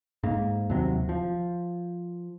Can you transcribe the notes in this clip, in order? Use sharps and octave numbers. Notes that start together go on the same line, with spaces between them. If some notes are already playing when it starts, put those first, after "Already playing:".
G#2 A#3
D#2 C3 F#3
F3